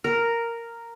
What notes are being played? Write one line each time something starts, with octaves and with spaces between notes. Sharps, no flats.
A#4